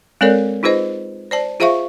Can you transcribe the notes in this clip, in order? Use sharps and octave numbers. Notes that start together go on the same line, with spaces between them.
G#3 C4 A4 A#4 C#5 D5
D#4 F4 G#4 B4 C5 D#5
C5 D5 A5
F4 G#4 C5 E5 F5 C#6